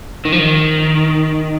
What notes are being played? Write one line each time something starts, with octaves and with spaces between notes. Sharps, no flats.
D#3
F3
D#3